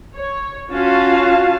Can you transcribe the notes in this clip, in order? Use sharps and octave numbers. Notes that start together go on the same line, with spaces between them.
C#5
C#4 F4 F#4 F5 A5